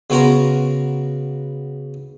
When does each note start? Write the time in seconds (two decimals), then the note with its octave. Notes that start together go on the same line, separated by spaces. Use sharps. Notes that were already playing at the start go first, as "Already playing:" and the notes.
0.10 C#3 B3 F#4 A#4 A#5 C6